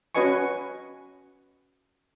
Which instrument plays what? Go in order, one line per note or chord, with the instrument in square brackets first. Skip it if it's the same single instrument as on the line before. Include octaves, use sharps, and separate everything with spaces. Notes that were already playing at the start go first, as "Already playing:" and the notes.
[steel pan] C#4 F#4 B4 D#5 G#5 C#6